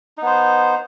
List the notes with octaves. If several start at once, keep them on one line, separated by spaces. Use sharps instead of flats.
B3 D#4 C5